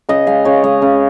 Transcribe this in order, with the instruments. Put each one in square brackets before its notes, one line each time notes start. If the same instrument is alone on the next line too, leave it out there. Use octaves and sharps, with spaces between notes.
[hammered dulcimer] C#3 D#5
G#3 F5
C#3 C#5
G#3 D#5
C#3